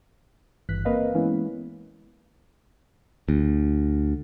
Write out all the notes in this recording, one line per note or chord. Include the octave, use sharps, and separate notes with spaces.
G#1 G2 E3 F#6 B6
A#3 C4 A#4 B4 D#5 F5
E3 G#3 A#3 B3 C#4 E4
D2